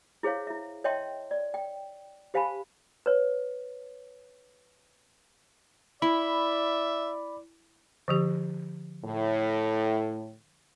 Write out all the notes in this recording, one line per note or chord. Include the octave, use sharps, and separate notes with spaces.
E4 G#4 C5 C#5 F5
E4 E5
C#5 D#5 E5 G5 A5 C6
D5
G5
G4 C5 F5 G#5 A5 B5
B4 C#5
E4 D5 E5 B5
D3 F3 G4
A2